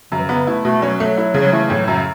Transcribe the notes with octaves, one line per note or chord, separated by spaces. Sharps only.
F#2 C#3
E3
C#3
B3
C#3
A3 E4
B2 A3
F#3 C#4
A3
E4
C#3
F#3
E3 A3
A2 F#3
F#2 C#3